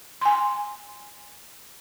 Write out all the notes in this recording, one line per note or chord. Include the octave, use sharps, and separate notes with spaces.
G#5 C6